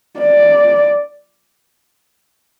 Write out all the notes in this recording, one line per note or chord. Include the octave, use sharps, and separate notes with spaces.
D5